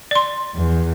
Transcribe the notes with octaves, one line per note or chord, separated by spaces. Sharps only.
D5 C6
E2